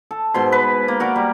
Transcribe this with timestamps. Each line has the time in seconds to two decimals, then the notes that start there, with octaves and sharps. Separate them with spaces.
0.11 A4
0.34 G#2 B2 C6
0.52 B4
0.88 A#3
1.00 F#4 A#4 D5
1.16 G3